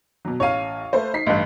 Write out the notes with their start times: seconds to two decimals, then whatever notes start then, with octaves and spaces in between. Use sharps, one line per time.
0.25 B2 F#3
0.40 A1 C#5 F5 D#7
0.93 A3 B4 C5
1.14 D#4 B6 C7
1.26 A1 G2